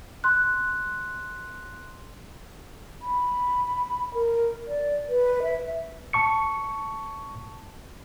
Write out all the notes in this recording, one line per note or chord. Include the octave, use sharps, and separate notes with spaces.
C6 F#6
B5
A#4
D5
B4
E5
A5 C#6 C#7